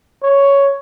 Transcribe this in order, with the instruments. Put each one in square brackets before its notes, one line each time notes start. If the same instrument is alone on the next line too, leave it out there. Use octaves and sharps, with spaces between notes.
[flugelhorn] C#5